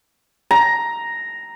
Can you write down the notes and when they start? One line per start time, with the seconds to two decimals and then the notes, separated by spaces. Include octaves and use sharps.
0.51 A#5